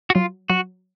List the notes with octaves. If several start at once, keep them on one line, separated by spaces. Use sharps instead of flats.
F#4
F#3 F4
F#3 F#4